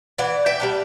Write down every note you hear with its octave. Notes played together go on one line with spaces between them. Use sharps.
E3 D5 F#5
E5 G5
G3 B3 D4